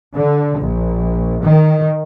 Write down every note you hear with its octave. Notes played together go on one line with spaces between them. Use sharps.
D3
A#1
D#3